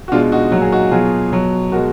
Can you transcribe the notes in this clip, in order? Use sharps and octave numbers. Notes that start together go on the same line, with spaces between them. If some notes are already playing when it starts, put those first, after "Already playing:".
F#4
B2 G#3 D4 F4
D#4 F#4
A#2 F#3 F#4
G#4
D#4 F#4
B2 F#3 F4 G#4
B2 F#3
B2 G#3 F#4 A#4